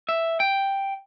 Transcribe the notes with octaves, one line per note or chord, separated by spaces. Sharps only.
E5
G5